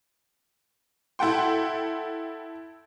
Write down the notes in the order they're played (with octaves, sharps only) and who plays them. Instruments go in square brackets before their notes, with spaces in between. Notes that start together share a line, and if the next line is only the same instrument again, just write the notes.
[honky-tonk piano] E4 A4 F#5 G5 C6